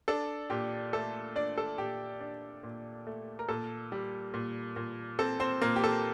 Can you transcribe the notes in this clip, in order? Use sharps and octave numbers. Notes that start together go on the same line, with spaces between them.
D4 A4
A#2 G4
A3 A4
D4 D5
A4
A#2 G4
D4
A#2
A3
A#4
A#2 A4
G3
A#2
A#2
C4 A4
C4 C5
A#2 A#3 A#4
G4
A4